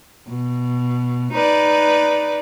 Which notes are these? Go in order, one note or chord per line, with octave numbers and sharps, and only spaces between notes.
B2
D#4 B4 D5